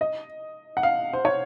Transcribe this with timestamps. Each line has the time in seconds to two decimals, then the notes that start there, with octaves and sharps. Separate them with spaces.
0.01 D#5
0.77 F#5
0.83 F5
1.13 C5
1.25 C#5